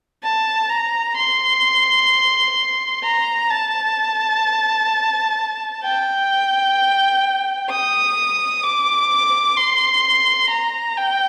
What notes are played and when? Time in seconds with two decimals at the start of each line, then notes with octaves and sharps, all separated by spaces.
0.24 A5
0.70 A#5
1.17 C6
3.04 A#5
3.50 A5
5.84 G5
7.70 D#6
8.63 D6
9.57 C6
10.50 A#5
10.97 G5